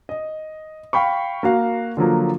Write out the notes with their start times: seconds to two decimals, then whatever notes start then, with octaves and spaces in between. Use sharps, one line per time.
0.09 D#5
0.93 F5 G5 B5 C#6
1.43 A#3 F#4 F5
1.97 D3 F3 F#3 A#3